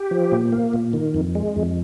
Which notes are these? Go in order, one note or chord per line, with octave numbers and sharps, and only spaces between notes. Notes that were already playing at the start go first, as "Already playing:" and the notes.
Already playing: G4
F3
A#2
A#3
A#2
D#3
F2
G#3
F2